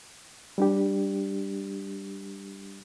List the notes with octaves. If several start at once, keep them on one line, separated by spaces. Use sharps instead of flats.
G3 D4 G4